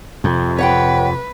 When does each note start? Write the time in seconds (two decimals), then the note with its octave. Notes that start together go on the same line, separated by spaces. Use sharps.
0.24 F2 C3
0.58 B4 C#5 F#5 G5